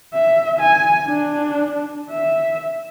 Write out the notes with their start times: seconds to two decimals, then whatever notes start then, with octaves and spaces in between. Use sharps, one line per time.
0.14 E5
0.60 G#5
1.08 D4
2.11 E5